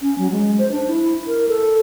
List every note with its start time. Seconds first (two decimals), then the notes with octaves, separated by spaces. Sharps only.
0.01 C#4
0.18 F#3
0.31 G#3
0.58 C5
0.72 D4
0.88 E4
1.27 A#4
1.48 A4